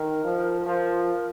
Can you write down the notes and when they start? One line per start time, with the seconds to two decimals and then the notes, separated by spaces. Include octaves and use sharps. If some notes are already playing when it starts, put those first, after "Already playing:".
Already playing: D#3 A#4
0.23 F3
0.65 F3 A#4